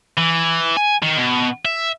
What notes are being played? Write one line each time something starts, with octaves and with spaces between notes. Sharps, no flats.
E3
G#5
D#3
B2
E5